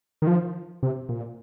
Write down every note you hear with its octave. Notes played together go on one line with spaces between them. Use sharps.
D#3
F3
C3
A#2